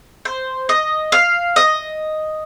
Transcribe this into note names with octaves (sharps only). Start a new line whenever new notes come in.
C5
D#5
F5
D#5